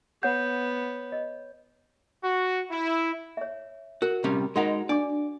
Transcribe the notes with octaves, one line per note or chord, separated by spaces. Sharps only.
B3 C#5 F#5 G6
D#5
F#4
E4
C#5 E5
F#4 A#4
C3 G3 C#4
G#3 D#4 F#4 A#4 F#5
D4 D5 D6